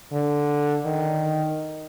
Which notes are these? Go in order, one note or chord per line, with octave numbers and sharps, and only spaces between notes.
D3
D#3